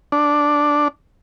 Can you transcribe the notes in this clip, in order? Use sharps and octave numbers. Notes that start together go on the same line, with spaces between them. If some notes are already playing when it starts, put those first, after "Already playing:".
D4